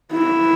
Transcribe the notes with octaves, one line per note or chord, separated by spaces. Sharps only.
E4